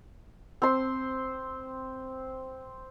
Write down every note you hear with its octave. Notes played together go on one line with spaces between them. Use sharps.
C4 C6